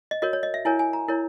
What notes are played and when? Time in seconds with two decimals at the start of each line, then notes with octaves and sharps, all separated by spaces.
0.11 D#5
0.22 F#4 A#4 C#5 D#5
0.33 C#5
0.43 D#5
0.54 E5
0.65 E4 A#4 C#5 G#5
0.79 G#5
0.93 A#5
1.08 E4 A#4 C#5